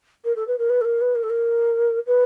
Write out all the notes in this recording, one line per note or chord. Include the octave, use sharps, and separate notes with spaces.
A#4
A4
B4
A#4
B4
A4
A#4
B4
A#4
A4
A#4
B4